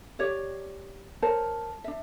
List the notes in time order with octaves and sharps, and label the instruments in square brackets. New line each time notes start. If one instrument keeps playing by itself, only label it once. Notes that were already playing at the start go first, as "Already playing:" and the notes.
[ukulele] G4 C#5 D5
[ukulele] A#4 C5 C#5 [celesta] A5
[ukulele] D4 E5